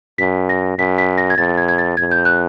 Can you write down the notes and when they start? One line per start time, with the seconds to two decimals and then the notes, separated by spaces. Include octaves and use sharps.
0.18 F#2 B6
0.49 A#6
0.79 F#2 B6
0.98 B6
1.18 A#6
1.30 G#6
1.38 F2 A6
1.57 G#6
1.69 G#6
1.78 A6
1.97 F2 G#6
2.11 G6
2.25 F#6